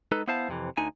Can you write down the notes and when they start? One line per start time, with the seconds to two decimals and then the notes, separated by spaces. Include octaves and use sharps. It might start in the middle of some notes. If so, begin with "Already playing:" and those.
0.12 G#3 D#4 A4 B4
0.28 B3 E4 C5 F5 A5
0.49 F2 C3 E3
0.77 D2 D3 D#4 G#5